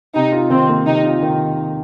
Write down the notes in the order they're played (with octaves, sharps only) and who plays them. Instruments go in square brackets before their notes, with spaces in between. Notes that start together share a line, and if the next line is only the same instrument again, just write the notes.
[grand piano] C3 [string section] D#4
[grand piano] F4
[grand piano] D#3 [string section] C4
[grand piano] A#3
[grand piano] C3 [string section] D#4
[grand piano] F4
D#3